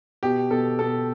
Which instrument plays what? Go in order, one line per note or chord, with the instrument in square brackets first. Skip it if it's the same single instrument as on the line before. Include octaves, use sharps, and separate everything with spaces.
[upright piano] B2 G4
B2 A4
B2 A4